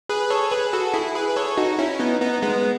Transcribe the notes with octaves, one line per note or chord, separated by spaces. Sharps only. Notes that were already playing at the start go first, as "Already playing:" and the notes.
G#4 B4
A4 C#5
G#4 B4
F#4 A4
E4 G#4
G#4 B4
B4
A4 C#5
D#4 F#4
C#4 E4
B3 D#4
B3 D#4
G#3 B3